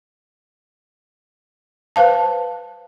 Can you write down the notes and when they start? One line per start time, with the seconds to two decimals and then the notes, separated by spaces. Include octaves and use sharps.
1.96 B4 C5 F5 A5